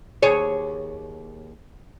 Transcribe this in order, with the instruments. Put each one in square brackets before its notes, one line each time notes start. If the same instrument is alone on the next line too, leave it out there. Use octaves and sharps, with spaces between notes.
[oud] D#2 G#4 C#5